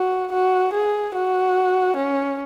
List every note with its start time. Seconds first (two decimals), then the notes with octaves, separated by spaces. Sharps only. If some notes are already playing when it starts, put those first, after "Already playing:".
Already playing: F#4
0.32 F#4
0.74 G#4
1.15 F#4
1.97 C#4